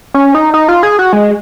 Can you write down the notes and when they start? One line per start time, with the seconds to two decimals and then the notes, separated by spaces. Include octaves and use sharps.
0.14 C#4
0.35 D#4
0.54 D#4
0.68 F4
0.83 G#4
0.99 F#4
1.13 G#3